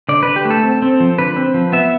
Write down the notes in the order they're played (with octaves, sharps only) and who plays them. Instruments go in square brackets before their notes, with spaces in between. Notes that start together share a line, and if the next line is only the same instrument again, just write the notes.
[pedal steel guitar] D3 D5
D3 B4
G4
A3
A4
C4
C4
F3
D3 B4
C4
F3
B3 E5